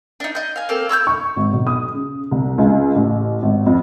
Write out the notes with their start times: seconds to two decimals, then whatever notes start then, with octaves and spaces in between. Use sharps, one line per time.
0.20 D4 D#4
0.35 D#5 G6
0.56 F5 G#5
0.69 A#3 C4 A4 F5
0.89 C#5 E6 F6 G6
1.07 C#6
1.36 G#1
1.53 B1
1.67 D#6
1.93 C#3
2.31 C2
2.58 C#2
2.96 A1
3.42 G#1
3.66 F2